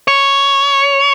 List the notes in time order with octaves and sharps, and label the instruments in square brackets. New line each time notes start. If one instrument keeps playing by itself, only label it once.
[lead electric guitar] C#5